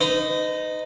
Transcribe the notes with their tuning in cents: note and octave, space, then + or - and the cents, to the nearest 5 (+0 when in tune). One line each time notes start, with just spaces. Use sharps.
D#4 -5 B4 +45